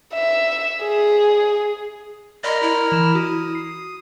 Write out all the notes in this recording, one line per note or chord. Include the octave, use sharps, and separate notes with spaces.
E5
G#4
A#4 D5 D#5 B5 C6 F6
E4
E3 E7
F#4 D#6
C7